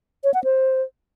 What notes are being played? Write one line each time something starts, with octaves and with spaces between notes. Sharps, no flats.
C#5
F#5
C5